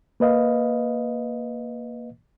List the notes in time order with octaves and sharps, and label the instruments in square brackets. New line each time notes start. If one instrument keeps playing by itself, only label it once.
[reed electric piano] A#3 B4 D#5 F5